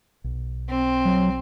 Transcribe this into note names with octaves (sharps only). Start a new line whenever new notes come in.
B1
C4
F#3